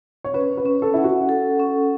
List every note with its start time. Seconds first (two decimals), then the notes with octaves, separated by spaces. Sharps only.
0.24 C#5
0.34 C#4 B4
0.57 B4
0.65 C#4
0.82 A4
0.94 E4 F#5
1.04 F#4
1.29 A4
1.60 C#4